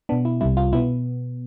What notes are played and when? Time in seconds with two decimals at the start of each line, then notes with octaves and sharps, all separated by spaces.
0.09 B2 B3 D4
0.25 E4
0.41 C2 C3 G3 E4
0.57 F4
0.73 B2 B3 E4